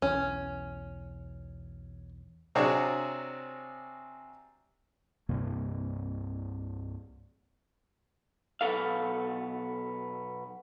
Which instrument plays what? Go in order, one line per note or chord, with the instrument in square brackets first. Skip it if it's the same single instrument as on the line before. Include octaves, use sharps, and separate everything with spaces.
[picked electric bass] B1 E2 [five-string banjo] C#4
[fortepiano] C3 F#3 C4 D4 F#4 G#4
[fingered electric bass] C2 G2 C3 A#3
[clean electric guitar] B1 C#3 B3 A4 F5